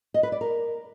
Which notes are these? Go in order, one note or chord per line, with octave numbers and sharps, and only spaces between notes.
D#5
B4
D5
A#4